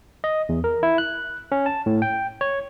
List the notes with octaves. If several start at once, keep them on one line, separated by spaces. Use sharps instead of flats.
D#5
E2
A#4
E4
F#6
C#4
A5
A2
G5
C#5